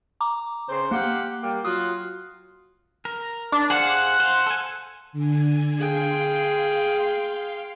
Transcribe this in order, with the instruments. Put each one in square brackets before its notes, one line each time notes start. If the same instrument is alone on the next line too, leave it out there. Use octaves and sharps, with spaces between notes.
[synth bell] A#5 D6
[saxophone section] C#3 C5
[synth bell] A#3 [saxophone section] G4 F5 F#5
[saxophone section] G3 A#3 G4
[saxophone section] F#3 F4 F#4 [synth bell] D#6
[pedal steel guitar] A#4
[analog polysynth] D4
[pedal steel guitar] G#4 C5 F5 [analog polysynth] F#5
[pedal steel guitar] C5 F5
A4 G#5
[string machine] D3 G#5
[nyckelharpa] G#4 G5 [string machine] F5 C6